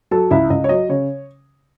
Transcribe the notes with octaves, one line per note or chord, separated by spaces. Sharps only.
F#3 A4 A5
C#2 E4 E5
C#2 D#5
C#5
F#3 D#5
C#3 C#5